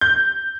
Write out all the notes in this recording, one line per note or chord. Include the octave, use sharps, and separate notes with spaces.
G6